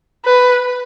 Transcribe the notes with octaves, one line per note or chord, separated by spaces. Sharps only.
B4